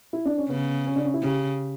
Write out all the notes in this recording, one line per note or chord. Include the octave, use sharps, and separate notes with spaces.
E4
D4
C#4
C#3 B3
C#4
D4
C#4
E4
C#3 G4